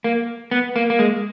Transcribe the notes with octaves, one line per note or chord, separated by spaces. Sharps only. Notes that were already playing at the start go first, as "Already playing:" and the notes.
A#3
B3
A#3
A#3
G#3